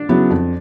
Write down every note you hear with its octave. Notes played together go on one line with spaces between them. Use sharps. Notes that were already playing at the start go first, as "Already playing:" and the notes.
Already playing: D4
C#3 F#3 B3 E4
F2